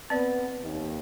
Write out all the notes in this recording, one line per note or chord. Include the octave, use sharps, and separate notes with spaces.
B3 C4 B4 D5
D#2